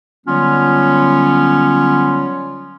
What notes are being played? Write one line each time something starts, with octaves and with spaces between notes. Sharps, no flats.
D3 F#3 G3 B3 C#4 F4